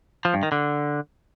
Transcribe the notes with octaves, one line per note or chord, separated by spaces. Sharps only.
F3
G2
D#3
D3